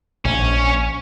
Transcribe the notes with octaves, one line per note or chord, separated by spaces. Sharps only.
A#1 C#4